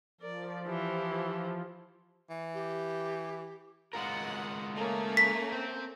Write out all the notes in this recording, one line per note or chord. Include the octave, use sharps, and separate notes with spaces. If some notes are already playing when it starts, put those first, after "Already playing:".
F3 A#4 D5
E3 G4
E3
G4
G#3 F4 A#4 F#5
A3 A#3 C#4
B6
C4